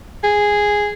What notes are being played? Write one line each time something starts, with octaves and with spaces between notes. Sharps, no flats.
G#4